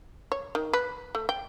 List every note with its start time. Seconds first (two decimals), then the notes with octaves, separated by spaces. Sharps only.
0.32 C#5
0.55 D#3
0.73 B4
1.15 A3
1.29 G5